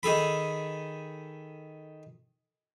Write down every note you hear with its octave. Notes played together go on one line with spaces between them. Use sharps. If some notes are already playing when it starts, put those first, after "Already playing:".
D#3 G#4 A4 B5